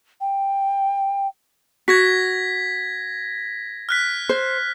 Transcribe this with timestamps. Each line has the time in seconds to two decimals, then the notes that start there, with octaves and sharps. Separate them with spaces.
0.20 G5
1.88 F#4 G#6 A#6 B6
3.89 F6 F#6 B6
4.29 C5